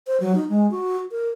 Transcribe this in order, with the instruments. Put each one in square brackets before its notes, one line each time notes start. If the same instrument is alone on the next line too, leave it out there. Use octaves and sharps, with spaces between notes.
[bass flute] C5
F#3
D#4
G#3
F#4
A#4